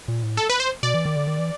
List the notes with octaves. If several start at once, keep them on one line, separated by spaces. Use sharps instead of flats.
A#2
A2
A4
B4
C5
B2 D5
E3
D#3
D3
D#3
E3